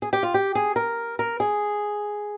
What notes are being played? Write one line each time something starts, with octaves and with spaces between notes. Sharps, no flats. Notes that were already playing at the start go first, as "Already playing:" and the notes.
G#4
G4
F4
G4
G#4
A#4
A#4
G#4